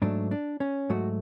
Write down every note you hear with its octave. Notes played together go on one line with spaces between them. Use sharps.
G#2 F#3 A3 D4
D4
C#4
G#2 F#3 A3 F#4